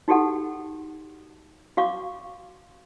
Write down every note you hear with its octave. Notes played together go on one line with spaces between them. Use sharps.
D#4 F#4 G4 A4 F#5
F#4 F5 C#6 D6